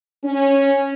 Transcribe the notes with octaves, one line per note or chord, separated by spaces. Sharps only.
C#4